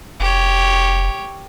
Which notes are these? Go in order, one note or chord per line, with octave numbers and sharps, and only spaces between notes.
F1 G4 C#5